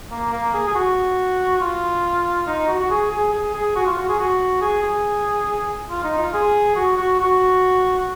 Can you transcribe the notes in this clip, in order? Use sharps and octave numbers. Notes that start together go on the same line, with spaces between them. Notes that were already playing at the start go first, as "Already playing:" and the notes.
A#3
A#3
G#4
G#4
F#4
F4
D#4
F#4
F#4
G#4
G#4
G#4
G#4
F#4
F4
F#4
G#4
F#4
G#4
G#4
F4
D#4
F4
G#4
F#4
F#4
F#4